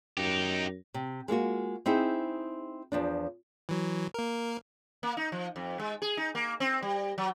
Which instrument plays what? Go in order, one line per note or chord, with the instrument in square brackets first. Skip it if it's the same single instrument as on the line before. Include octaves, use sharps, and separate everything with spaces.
[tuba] F#2 [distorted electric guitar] D#4 G4
[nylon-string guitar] C3
G#3 A#3 F4 F#4
C4 D#4 E4 G#4
E2 F3 D4
[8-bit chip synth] E3 F#3
A#3 A#4
[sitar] A#3
D#4
F3
F2
G#3
G#4
D#4
A#3
C4
G3
F#3